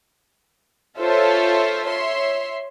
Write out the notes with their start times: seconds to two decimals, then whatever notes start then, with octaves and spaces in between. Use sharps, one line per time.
0.98 F4 A4 C5 C#5 E5
1.87 C#5 E5 C6